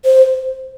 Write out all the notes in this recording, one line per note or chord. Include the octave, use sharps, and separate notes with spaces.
C5